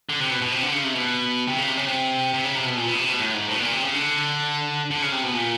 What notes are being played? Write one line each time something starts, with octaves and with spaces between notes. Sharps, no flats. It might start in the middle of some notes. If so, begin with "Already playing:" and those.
D3
C3
B2
B2
C3
D3
C#3
C3
B2
C3
C#3
C3
C#3
C3
C3
C#3
C3
B2
A#2
B2
C3
B2
A2
G#2
A2
B2
A#2
C3
C#3
D3
D3
C#3
C3
B2
A#2